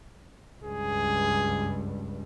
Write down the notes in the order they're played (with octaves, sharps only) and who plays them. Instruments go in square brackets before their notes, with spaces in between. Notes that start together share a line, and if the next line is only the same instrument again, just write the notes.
[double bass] C#2 G2 [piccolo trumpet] G#4